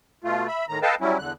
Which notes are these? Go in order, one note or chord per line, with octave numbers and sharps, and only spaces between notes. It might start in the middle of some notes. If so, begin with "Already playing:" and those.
B2 A3 F4
E5 B5
A2 D#3 A#5
A4 B4 D#5 F5 G5 A5
F#3 G3 C#4 E4
E2 D3 F#6